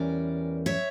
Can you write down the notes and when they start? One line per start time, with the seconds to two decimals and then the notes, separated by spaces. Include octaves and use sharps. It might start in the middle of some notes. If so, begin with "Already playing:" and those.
Already playing: E2 E3 G3 C#4 A#4 D5
0.66 C#5 E5